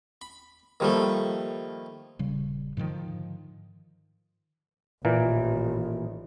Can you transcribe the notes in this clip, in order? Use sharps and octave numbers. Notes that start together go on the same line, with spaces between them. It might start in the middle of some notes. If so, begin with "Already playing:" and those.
B5
D#3 F3 G3 A3 A#3
D#1 C#3 G3
G#2 D3 D#3 F3
A1 A#2 D#3 E3 A#3